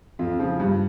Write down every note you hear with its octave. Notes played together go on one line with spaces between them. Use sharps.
F2 F4
C#3 F3
G2